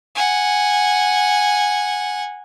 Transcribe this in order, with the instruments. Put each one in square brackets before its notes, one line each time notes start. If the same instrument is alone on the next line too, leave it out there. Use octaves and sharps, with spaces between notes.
[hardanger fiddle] F#5 G#5